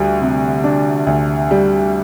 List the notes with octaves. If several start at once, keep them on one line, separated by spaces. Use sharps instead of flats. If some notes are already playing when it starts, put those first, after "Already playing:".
Already playing: D2 G3
C3
D4
D2
G3